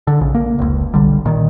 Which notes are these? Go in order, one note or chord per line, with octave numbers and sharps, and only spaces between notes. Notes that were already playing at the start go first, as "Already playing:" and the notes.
D3
A#1 C#3
A#3
F1 C#2
B1 D3 G3
A#2 D#3